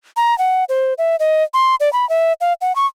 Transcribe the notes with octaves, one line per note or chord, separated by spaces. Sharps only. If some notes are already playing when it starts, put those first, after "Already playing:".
A#5
F#5
C5
E5
D#5
C6
D5
B5
E5
F5
F#5
C#6